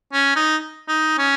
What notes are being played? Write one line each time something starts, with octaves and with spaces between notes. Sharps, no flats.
C#4
D#4
D#4
C#4